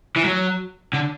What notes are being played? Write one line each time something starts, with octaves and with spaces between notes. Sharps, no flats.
E3
F#3
D3